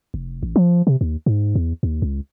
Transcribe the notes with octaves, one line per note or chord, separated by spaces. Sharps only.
F1
A1
F3
C3
D#2
G#2
E2
D#2
C#2